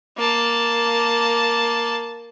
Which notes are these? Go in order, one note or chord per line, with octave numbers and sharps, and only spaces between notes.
A#3 A5